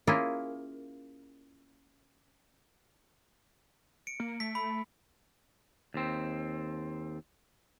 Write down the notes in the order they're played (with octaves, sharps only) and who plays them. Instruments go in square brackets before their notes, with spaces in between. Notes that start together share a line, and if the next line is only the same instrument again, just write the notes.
[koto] A#3 C#4 E4 F4 G#4 A#4
[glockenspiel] C#7 D7
[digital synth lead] A#3
[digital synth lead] A3 [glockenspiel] B6
[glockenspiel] B5
[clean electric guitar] D#2 C4